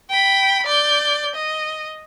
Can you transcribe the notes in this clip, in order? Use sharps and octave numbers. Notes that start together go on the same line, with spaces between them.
G5 B5
D5 G6
D#5